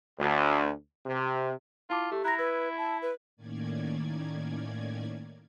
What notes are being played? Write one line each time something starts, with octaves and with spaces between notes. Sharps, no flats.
D2
C3
E4 F4 A5 D6
A3 G4
E4 A#5 F#6 A#6
B4 E6 G#6
A5
B4
A2 D#3 A#3 C#4 D5 G#6